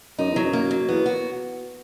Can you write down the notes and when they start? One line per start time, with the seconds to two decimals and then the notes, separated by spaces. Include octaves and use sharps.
0.18 F#2 D#4
0.31 E2 F#3
0.43 F#2
0.53 A#3
0.71 F#3
0.88 E2 B3
1.06 F#4